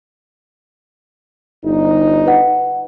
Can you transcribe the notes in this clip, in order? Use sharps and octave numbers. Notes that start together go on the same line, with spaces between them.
G1 D#4
B4 F#5